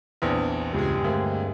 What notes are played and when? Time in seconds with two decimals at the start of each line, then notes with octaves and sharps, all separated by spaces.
0.22 A#1 E2 E3 C4 D4
0.73 C#2 G2 G#3 G4 G#4
1.04 D2 A#3 C4